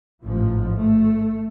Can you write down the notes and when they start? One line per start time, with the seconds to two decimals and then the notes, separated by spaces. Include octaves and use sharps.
0.25 A1 G#2 F3
0.77 A3